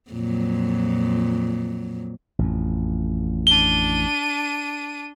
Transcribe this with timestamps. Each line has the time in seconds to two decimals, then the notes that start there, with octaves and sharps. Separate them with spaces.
0.11 F2 A#2 F#3
2.39 A1 F2
3.47 D4 D#7 G7